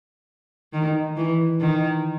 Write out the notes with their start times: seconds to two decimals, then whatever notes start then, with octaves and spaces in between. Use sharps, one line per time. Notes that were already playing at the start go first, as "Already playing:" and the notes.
0.73 D#3
1.16 E3
1.60 D#3